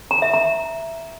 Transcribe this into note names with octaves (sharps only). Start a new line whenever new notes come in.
A#5
E5
A#5